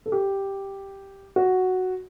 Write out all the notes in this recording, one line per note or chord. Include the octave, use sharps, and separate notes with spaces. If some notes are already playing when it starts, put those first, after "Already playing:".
A4
G4
F#4